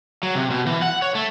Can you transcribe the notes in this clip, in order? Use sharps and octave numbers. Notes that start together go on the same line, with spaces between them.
F#3
C3
B2
E3
F#5
C#5
A3